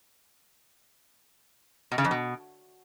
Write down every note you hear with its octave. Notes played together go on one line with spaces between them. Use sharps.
B2
C#3
F2
B2